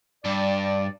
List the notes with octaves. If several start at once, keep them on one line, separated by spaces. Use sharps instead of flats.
G2 D5